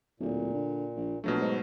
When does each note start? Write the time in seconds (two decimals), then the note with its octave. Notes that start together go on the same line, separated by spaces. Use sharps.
0.20 D1 A#2
0.53 D3
0.97 A#1
1.24 A#1 B2 F#3 A3
1.41 G#2